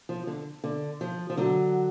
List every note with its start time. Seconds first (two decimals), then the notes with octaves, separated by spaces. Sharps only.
0.09 F3
0.27 D3
0.64 D3
1.01 F3
1.30 F3
1.37 D3 F#3